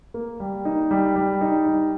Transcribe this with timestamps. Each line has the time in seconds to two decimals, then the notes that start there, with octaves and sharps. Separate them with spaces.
0.14 A#3
0.40 G3
0.65 D#4
0.91 G3
1.16 G3
1.41 D#4
1.66 G3